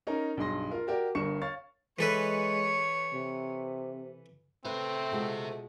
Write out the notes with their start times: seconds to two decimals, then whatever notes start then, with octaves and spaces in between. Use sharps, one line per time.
0.07 C#4 D#4 A#4 A#5
0.37 B1 G2 G#4 C6 A#6
0.71 F4 A#4
0.87 F#4 G4 A#4 D5
1.15 G1 G2 A#4 C#6 C#7 E7
1.41 C#5 F5 C#6 A6
1.99 E3 G#3 A4 B4 C#5
3.14 C3
4.65 A3 C4 B4 C5 E5
5.12 B2 G#3 F4